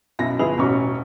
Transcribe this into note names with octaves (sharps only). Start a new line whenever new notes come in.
B1 F#2 E4 A#6
G1 F3 E4 G#4 B4 F7
E1 A1 C#4 F#4 C#6